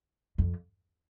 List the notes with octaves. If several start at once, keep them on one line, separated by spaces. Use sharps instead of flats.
F2